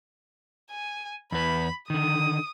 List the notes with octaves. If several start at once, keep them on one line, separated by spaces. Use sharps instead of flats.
G#5
E2 B4 B5
D3 D#3 D#6